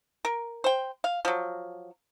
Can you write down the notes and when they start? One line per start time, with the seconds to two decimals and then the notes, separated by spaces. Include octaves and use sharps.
0.25 A#4
0.64 C5 G5
1.04 F5
1.25 F3 F#3